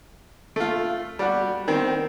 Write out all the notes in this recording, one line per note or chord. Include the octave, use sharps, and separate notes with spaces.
A3 F4
G3 F#4
D#3 C4